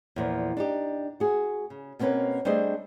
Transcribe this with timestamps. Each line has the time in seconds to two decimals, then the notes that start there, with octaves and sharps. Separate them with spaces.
0.16 E2 A#2 F3
0.57 D4 D#4 G4
1.20 F#4 G#4
1.70 C#3
1.99 B2 A#3 C4 C#4 A#4 B4
2.45 G3 A3 D4 G#4 C5 D#5